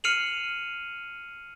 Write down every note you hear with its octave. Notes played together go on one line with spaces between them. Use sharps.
F6 C7 C#7 D#7 F7 F#7